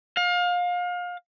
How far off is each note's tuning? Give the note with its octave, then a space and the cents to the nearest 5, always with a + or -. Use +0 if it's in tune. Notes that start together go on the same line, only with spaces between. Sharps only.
F5 +30